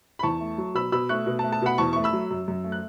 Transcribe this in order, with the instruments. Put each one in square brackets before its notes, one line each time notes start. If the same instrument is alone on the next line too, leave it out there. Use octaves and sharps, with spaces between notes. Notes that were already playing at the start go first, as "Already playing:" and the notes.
[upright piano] B5
E2 A5 C#6
A3
F#3
B2 B5 E6
B2 B5 E6
A3 C#6 F#6
B2
A5
A3
A5
B2 F#5 B5
E2 A5 C#6
A3 C#6
B5 E6
F#3
F#2
F#2
A3
F#6